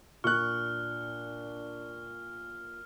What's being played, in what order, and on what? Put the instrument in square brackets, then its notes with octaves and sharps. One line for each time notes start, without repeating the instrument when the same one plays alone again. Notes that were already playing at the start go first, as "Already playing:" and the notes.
[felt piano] A#2 [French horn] D4 [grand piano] C#6 F#6 [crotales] F6